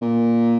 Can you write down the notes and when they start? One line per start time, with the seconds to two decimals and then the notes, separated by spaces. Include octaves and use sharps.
0.02 A#2